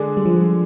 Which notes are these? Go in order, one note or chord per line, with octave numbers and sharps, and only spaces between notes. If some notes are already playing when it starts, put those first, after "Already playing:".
Already playing: D3 G#3 D4 G#4 D5
G3
F3